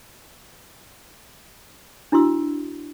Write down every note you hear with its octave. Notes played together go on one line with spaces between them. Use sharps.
D4 E4 F#4 C6 E6